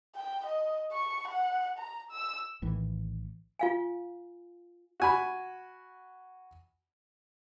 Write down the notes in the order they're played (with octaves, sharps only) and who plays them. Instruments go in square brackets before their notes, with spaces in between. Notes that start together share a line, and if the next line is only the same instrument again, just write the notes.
[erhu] G5
D#5
C#6
F#5
A#5
E6
[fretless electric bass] A#1 A2 D#3 E3
[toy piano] F4 F5 G#5
[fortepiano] F#4 G#5 B5